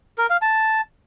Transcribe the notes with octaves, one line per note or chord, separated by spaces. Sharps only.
A#4
F5
A5